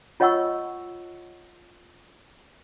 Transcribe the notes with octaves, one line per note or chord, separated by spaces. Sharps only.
F4 C#5 D#5 F#5 C#6 E6